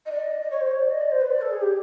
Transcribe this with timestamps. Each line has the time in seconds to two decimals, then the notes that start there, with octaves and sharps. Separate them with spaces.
0.05 D#5
0.11 D5
0.21 D#5
0.30 D5
0.41 D#5
0.51 C#5
0.60 C5
0.71 C#5
0.81 D5
0.91 D#5
1.01 D5
1.11 C5
1.21 B4
1.31 D5
1.41 A4
1.51 G#4
1.61 G4